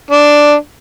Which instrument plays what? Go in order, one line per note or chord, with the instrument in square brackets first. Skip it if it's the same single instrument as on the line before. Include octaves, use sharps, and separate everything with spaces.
[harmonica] D4